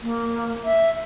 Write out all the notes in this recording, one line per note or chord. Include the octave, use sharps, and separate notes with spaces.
A#3
E5